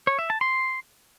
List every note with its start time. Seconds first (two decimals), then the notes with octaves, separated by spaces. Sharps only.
0.07 C#5
0.19 E5
0.30 A5
0.41 C6